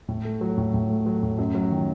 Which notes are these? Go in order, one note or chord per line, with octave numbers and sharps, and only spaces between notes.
A2
A3
F#3
A2
A2
A3
F#3
A2
F#2
F#3
D#3